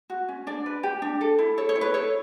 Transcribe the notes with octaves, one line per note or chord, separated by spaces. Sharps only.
F#4
C#4
D4 D5
B4
G4
D4
A4
E4
A4 C#5
C#5
E4
B4
A4 C#5